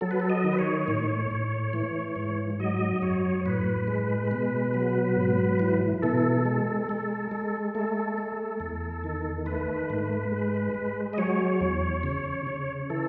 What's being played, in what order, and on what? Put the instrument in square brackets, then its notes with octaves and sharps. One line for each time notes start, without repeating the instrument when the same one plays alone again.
[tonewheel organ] F#3 A4
B4
A4
D#5
D#3
B4
C#5
A2
A2
E3
G#2
F#3 D#5
F#2 C#5
A2 B4
G#3
B2
F#3
G#2
E3
B2 A4
G#3
G#3
G#3
A3 A4
A3
E2
D#3
A3 B4
G#2
G#3
G#3
D#5
F#3 C#5
E2
C#3
C#3
E3 A4